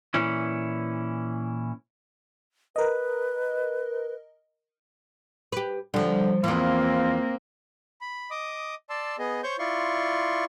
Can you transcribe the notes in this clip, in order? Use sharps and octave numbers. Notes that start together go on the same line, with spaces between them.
A#2 E3 C#4 E4
A#4 B4 D#5
G4 B4
D3 F3 G3
E2 E3 A#3 C4 F4
B5
D#5 D6 D#6
D5 A5 C6 E6
B3 G#4 D#5
C5 C#5 C#6 G6
E4 F4 D5 C6 C#6